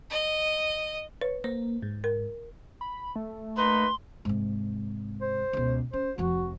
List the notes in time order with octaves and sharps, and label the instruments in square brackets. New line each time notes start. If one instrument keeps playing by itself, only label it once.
[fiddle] D#5
[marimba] B4 [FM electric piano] C#5
[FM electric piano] A#3 [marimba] C5
[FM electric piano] G#2
[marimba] A#4
[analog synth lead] B5
A3
[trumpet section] A#3 D#4 B4 [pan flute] C6
[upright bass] G#2 C3
[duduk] C5
[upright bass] C#2 B2
[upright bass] C#4 [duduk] C5
[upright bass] F1 F3 [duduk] F#4